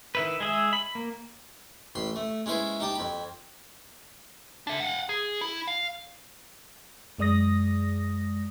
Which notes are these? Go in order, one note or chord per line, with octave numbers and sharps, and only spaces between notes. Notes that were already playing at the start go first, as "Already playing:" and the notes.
D#3 E4 B4
G#3 G#4 E5
B5
A#3
A1 B5 C6
A3
G#3 C#4 E4 B4 C5
D#4 G4 A5
F2 B5
D4 E5
F5 F#5
G#4
E4
F5
F#2 G#3 D5 D#6 A#6